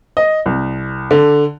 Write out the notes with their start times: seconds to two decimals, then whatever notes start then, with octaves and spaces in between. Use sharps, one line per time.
0.17 D#5
0.46 C2
1.11 D3